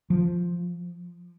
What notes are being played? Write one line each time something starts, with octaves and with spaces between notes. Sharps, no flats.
F3